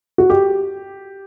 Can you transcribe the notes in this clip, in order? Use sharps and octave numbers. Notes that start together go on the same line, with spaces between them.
F#4
G4